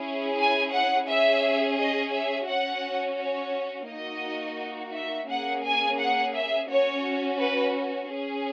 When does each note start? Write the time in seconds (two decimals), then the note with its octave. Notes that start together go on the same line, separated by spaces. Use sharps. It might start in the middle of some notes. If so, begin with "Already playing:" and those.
Already playing: C#4 E4 G#4
0.38 G#5
0.73 F#5
1.08 C#4 G#4 E5
1.79 D#5
2.14 E5
2.48 C#4 F#4 F#5
3.18 C#5
3.88 A#3 D#4 F#4 D#5
4.94 E5
5.29 A#3 C#4 G#4 F#5
5.65 G#5
5.99 F#5
6.35 E5
6.69 C#4 F#4 C#5
7.39 B4
8.09 C#4 G#4